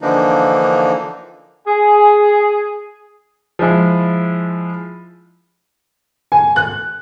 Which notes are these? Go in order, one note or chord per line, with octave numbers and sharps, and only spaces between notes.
D3 E3 F3 A#3 D4 D#4
G#4
F3 G#3 E4
G#5
F#6